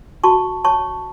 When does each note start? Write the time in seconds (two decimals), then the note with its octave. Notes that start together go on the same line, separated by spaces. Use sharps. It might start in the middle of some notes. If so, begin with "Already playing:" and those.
0.24 F#4 A5 C#6
0.65 C#5 A5 C#6